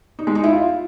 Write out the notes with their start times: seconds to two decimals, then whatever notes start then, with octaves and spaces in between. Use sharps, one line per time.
0.19 D#4
0.27 G#3
0.35 D#4
0.44 E4
0.52 F4